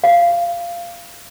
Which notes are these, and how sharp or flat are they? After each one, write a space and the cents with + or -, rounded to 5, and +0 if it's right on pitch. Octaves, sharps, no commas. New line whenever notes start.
F5 -15